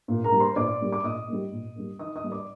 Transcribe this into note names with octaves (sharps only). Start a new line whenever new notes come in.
A#2
A#4 A#5
G3 A#3
C5 C6
A#2 D5 D6
G3 A#3
D6
A#2 D#5 D#6
G3 A#3
A#2
G3 A#3
D#3 D#5 D#6
D#5 D#6
G3 A#3
D5 D6